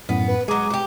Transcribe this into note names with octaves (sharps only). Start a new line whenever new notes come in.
F#2 A2 B3
B4
F#3 G#3 G#4 A#5 D6
F#4 G4